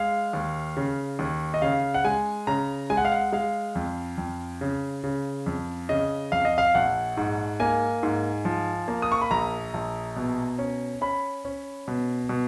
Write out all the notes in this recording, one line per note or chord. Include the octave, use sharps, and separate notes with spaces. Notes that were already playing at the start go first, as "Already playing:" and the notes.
Already playing: G#3 F5
D#2
C#3
D#2
D#5
C#3 F5
F#5
G#3 G#5
C#3 A#5
G#3 G#5
F#5
F5
F#5
G#3 F5
F2
F2
C#3
C#3
F2
C#3 D#5
F2 F5
D#5
F5
A#1 F#5
G#2
A#3 G#5
G#2
F3
A#3
D#6
C#6
B5
A#1 A#5
A#1
B2
C#4
C#4 B5
C#4
B2
B2